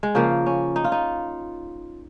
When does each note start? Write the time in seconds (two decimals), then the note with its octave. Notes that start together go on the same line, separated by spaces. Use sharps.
0.03 G#3
0.15 C#3 F3 A#3
0.46 C#4
0.76 D#4
0.84 F4
0.92 D#4